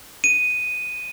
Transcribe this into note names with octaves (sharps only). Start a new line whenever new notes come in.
D#7